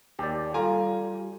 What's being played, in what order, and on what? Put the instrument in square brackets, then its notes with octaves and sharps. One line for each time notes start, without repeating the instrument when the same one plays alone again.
[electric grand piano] D#2 [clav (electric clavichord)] G4 D5
[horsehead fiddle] G3 [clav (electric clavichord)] F4 [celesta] A4 F5 [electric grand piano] G#5 A#5